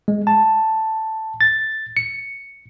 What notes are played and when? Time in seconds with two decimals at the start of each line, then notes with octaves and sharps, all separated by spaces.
0.08 G#3
0.27 A5
1.41 A6
1.97 C#7